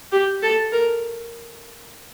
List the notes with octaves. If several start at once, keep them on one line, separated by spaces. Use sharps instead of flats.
G4
A4
A#4